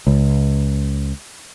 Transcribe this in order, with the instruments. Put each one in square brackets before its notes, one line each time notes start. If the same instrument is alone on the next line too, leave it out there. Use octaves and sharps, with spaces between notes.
[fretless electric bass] C#2